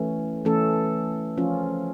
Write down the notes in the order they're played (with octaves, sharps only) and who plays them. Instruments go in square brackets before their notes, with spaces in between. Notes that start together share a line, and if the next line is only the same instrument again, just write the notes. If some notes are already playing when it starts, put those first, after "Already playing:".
Already playing: [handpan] E3 A3 C#4
E3 A3 C#4 A4
F3 C#4 F4